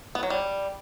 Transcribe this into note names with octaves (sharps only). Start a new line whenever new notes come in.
B3
F#3
G3